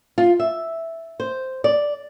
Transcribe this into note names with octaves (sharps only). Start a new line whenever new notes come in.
F4
E5
C5
D5